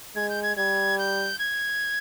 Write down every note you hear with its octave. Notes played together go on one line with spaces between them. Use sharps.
G#3 G#6
G6
G#6
G3 G#6
G6
G#6